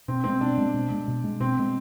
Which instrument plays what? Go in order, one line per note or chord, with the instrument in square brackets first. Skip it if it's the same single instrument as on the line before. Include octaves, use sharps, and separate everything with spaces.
[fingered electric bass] B2 [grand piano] C4
[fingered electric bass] G#3 B3 [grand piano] C4
[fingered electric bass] B2 [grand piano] D4
[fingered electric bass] G#3 B3
B2
G#3 B3
B2
G#3 B3
[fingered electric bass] B2 [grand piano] C4
[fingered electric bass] G#3 B3